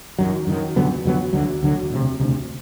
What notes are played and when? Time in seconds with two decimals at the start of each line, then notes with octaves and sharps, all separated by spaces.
0.18 F#2 D#3 F#3
0.47 F#2 D#3 F#3
0.76 F2 D3 F#3 B3
1.05 F2 D3 F#3 B3
1.33 D2 D3 F#3
1.63 D2 D3 F#3
1.90 E1 D2 C3
2.19 E1 D2 C3